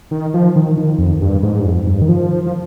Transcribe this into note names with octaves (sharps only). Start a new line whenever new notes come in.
D#3
F3
D#3
D#3
F2
G2
G#2
G2
F2
G2
D#3
F3
F3